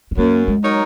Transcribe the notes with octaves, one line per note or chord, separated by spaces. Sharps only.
C#4
F#2 A#3
G#3
F#3 D#4 A#4 C#5